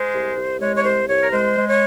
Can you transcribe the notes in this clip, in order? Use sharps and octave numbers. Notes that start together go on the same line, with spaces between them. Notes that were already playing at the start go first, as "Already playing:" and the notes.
Already playing: G#3 C5
C2
C2
G#3 C#5
C#5
C2 C5
C2 C#5
A#4
G#3 C5
G#3
C#5